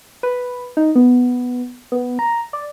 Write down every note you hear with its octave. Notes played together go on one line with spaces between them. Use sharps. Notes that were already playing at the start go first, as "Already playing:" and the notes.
B4
D#4
B3
B3
A#5
D5